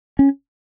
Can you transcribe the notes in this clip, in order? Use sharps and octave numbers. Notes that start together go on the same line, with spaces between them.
C#4